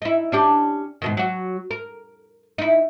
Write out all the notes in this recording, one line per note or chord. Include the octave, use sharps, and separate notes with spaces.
D#4 E4
C#4 D4 G4
G#2 B2 D#3
F#3 F#4
A#4
D#4 E4